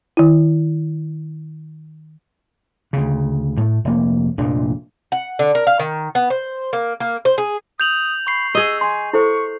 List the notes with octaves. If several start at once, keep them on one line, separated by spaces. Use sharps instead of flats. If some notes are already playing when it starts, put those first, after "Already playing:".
D#3 E4
D2 C#3
A2 A3
F1 A#3
F1 A#1 A#2 D4
F#5
D3
A#4
F5
D#3
B3
C5
A#3
A#3
C5
G#4
D#6 G6 F7 F#7
B5 C#6 C7
G#4 D#5 E6
G#5 C6
E4 A4 C5 C#6